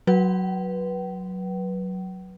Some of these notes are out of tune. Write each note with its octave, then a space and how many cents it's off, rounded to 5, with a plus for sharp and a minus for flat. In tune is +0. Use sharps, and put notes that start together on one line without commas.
F#3 +0 B4 -15 G5 -45